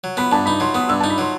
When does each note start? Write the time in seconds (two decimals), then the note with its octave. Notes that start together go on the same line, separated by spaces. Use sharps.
0.04 F#3
0.17 B3 B5
0.32 G2 A5
0.46 D#4 B5
0.60 F#3 C6
0.75 B3 D#6
0.89 G2 E6
1.00 A5
1.04 D#4
1.10 B5
1.18 F#3 C6